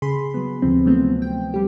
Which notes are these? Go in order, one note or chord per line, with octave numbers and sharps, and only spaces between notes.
C#3 G#4 B5 C6
F#3 B3
D2 C3 F3 C4
C3 F3 F#3 A3 B3 C4
G5
G3 G4